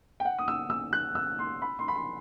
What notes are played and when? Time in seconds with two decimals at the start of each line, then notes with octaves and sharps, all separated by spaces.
0.20 G5
0.25 F#5
0.39 D#6
0.48 E6
0.70 E6
0.93 F#6
1.15 E6
1.39 C6
1.62 B5
1.79 C6
1.88 B5
1.96 C6